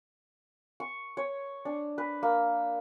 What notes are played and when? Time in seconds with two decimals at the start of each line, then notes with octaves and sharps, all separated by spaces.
0.80 C#6
1.17 C#5
1.65 D4
1.98 B4
2.23 A#3